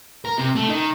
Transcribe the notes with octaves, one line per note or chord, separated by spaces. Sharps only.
A#4
C3
A3 A4
D#3